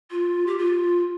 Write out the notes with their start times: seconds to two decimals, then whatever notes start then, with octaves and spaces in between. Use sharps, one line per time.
0.11 F4
0.47 G4
0.58 F4